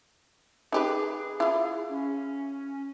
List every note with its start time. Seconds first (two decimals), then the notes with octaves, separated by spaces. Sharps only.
0.72 D#4 G4 G#4 B4
1.40 E4 F4
1.89 C#4